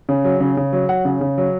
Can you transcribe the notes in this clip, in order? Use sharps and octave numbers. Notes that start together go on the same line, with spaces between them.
C#3
F#3
C#3
C#3
F#3
F#3 F#5
C#3
C#3
F#3